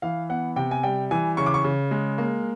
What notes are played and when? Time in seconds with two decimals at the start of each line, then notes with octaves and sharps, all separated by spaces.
0.02 E3 F5
0.29 B3 F#5
0.56 C3 G5
0.71 G#5
0.83 G3 G5
1.11 E3 G#5
1.37 C#3 C#6
1.46 D6
1.54 C#6
1.64 C#3
1.91 G#3
2.18 A#3